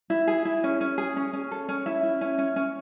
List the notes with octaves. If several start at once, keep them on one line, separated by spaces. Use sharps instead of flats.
E4
G#4
E4
C#4
C#4
G#4
C#4
C#4
A4
C#4
E4 E5
E4
C#4
C#4
C#4